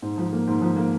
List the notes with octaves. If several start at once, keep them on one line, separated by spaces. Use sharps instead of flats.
G#2
F3
A#3
G#2
F3
A#3